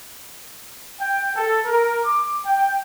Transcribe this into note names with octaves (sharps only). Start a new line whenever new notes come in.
G5
A4
A#4
D6
G5